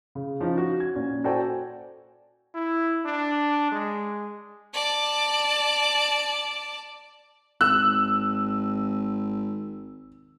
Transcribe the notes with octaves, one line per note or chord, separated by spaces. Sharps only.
C#3
F3 C#4 D#4
F#4
G#6
A#2 C#4
F#4 A4 C5 D5 G5 G#5
E4
D4
G#3
D5 A5
G#1 E6 F#6